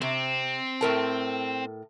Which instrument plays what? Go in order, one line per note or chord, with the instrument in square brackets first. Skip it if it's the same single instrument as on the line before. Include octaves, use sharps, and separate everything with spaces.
[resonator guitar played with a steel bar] C3 [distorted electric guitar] C4
[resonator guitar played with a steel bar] A2 A#4 A5